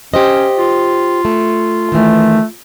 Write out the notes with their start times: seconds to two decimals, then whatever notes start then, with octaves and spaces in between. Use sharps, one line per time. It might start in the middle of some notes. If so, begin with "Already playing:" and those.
0.14 C#4 G4 C5 D#5
0.58 F4
1.25 A3
1.92 D#3 E3 A3